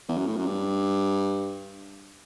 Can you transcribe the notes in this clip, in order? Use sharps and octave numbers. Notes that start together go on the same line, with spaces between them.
E2
F#2
A2
F#2
G2